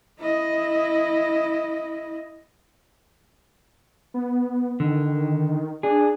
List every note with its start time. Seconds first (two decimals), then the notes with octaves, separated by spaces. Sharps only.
0.19 E4 D#5
4.14 B3
4.80 D3 D#3
5.83 D4 G#4